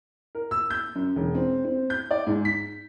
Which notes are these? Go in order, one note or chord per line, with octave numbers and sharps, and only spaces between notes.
A#4
E6
G6
F#2
E1
C4
C4
G6
D5
G#2
B6